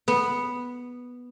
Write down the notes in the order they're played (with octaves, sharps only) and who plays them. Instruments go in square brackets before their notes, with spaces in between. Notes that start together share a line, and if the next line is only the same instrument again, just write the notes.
[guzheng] B3